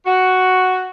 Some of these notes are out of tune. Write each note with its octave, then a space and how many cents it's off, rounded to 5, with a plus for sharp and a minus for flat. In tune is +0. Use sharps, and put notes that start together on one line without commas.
F#4 +0